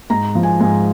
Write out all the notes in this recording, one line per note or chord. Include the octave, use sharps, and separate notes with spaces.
G#2 A#5
F3
G#5
G#2 G#5